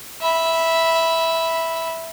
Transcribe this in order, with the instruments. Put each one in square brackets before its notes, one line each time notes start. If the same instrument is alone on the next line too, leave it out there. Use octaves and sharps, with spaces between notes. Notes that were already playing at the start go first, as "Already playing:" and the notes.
[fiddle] E5 B5